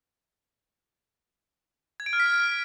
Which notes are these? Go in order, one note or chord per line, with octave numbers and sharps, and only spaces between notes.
G#6
D7
F6
B6
F6